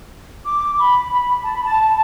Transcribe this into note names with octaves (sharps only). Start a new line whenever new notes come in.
D6
B5
B5
A5
B5
A5